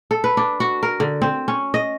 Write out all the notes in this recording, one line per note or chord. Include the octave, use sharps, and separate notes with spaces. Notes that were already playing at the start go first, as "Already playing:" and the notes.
A4
B4
D4
F#4
A#4
D3
C4
C#4
D#5